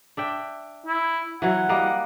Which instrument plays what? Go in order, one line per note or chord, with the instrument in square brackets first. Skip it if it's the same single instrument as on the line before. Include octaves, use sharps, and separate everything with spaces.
[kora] D4 E5 G5
[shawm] E4
[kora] E3 F#3 [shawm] F#5
[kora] G3 A#3 D#5